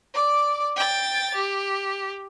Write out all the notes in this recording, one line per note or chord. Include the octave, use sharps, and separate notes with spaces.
D5 D6
G5 A6
G4